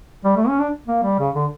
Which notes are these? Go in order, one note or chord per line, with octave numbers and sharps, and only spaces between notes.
G3
A3
C#4
D4
A#3
G3
C#3
D3